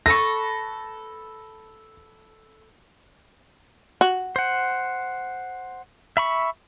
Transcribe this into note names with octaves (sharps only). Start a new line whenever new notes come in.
A4 B4 C#6 A#6
F#4
C5 F#5
E5 B5 C#6